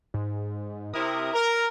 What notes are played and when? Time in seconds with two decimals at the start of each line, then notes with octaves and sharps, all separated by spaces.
0.14 G#2
0.94 C3 E4 A#4 D#6
1.33 A#4 A#5